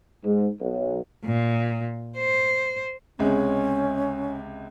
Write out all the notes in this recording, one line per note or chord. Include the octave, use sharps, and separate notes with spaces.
G#2
B1
A#2
C5
C#2 C3 G#3 C#4